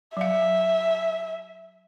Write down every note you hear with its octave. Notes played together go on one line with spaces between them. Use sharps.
F#3 E5 F5